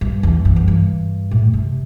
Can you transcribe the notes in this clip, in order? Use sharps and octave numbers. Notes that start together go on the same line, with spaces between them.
G2
E2
G2
E2
G2
A2
C3